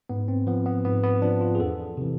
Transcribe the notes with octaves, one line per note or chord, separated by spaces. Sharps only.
G#2 B3
C4
F3 B3
B3
G#2 B3
B3
F3 D4
F4
G#4
E2 A4
C3 E3